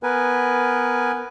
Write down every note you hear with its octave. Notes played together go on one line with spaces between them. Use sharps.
B3 A#4 B4 G#5